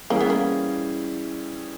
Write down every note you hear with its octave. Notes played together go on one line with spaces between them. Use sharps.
E3 G3 A#3 C#4 E4 G#4
B3
A#3